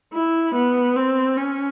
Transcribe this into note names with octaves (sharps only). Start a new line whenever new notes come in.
E4
B3
C4
C#4